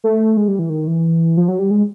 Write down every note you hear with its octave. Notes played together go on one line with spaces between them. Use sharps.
A3
G#3
G3
E3
D#3
E3
F3
F#3
G3
G#3